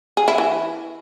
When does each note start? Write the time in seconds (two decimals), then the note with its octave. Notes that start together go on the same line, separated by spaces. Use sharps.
0.17 G#4
0.28 E4
0.38 E3